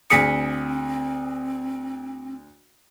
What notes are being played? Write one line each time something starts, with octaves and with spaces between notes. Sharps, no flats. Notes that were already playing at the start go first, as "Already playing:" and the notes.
D2 C4 G#4 D#6 B6 C#7